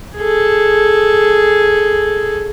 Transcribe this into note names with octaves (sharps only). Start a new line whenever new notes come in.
G#4 A4